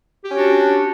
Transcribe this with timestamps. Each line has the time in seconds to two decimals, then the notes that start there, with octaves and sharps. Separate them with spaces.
0.25 G4
0.30 C#4
0.34 F#4
0.39 D4